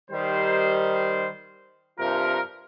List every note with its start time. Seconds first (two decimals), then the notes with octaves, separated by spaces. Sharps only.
0.11 D#3 G3 C5
1.99 G2 C3 F4 A#4